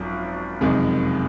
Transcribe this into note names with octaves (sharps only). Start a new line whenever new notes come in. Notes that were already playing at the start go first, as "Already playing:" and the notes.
Already playing: G#1 F#2 F3
F#1 F2 C3 D#3 G#3